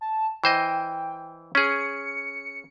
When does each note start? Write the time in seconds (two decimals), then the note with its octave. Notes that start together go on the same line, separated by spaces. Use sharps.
0.01 A5
0.44 E3 C5 D#5 G5
1.55 C#4 G#4 C#7